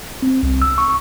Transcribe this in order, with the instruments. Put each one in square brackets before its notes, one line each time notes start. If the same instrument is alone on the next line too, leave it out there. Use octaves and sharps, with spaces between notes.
[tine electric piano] C4
C2
E6
C#6